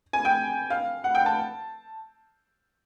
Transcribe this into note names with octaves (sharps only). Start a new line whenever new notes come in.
G#5
G5
F5
F#5
G5
A5